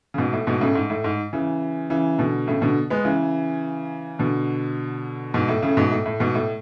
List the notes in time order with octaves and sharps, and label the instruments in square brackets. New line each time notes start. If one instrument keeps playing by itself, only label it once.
[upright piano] C#3
G#2 B2
A2
G#2 B2
A2 C#3
G#2
A2
G#2
C#3 E3
C#3 E3
B2 D3
A2 C#3
B2 D3
G#3 B3
C#3 E3
B2 D3
G#2 B2
A2
A2 C#3
G#2 B2
A2
A2
G#2 B2
A2